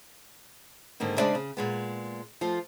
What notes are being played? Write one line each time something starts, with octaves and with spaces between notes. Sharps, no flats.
G#2 D3 D#3 A#3 D#4
C#3 G#3 D4 C5 D5 E5
C#3
A#2 G#3 B3
F3 A3 F4